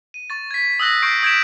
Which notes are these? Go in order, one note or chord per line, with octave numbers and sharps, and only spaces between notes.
D#7
C#6 A6
G#6 B6
D#6 E6 F#6 A#6
C#6 G6 B6 C7 D7
D#6 G6 G#6 B6 D7 E7